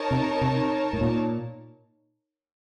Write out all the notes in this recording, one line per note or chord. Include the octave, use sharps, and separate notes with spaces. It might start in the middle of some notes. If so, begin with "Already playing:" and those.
Already playing: D#4 A#4 C#5 A5
C3
C3
A2
A#2